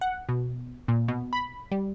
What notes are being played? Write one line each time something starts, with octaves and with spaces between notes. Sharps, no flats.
F#5
B2
A#2
B2
B5
G3